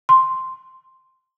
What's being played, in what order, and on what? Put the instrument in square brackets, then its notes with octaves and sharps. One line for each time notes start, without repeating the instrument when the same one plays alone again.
[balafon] C6